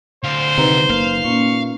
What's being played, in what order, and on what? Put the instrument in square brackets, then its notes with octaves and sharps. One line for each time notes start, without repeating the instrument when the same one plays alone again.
[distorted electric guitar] D2 F5 [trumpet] C5
[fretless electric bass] C3 D#3 [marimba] D#4 B4 A#5
[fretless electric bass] F#1 A#3 [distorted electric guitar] F5
[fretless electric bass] A#2 [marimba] A#3 C#4 [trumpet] C#6